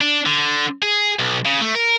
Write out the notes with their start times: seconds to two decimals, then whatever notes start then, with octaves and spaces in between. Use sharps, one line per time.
0.01 D4
0.26 D3
0.82 G#4
1.19 B1
1.45 C#3
1.61 A3
1.75 A#4